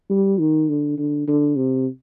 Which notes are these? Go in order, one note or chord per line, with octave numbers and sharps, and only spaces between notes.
G3
D#3
D3
D3
D3
C3